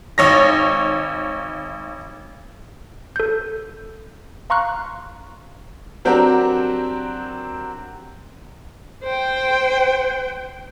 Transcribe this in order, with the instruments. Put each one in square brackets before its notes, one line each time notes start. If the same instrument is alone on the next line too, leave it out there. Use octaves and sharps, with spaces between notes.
[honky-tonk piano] G#1 C#5 A#6
[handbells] A4 G6
F5 A#5 C6 C#6 F6 F#6
[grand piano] F#3 C4 D4 F#4 G4 A#4
[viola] C5 G5